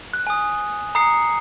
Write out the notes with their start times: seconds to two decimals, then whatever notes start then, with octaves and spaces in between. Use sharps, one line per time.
0.13 F#6
0.27 G#5 D#6
0.95 A#5 D#6 C7 C#7